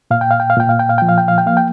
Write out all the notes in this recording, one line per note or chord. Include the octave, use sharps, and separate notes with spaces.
A#2 F5
G5
F5
G5
F5
A#2 G5
F5
G5
F5
F3 G5
F5
G5
F5
G5
A#3 F5
G5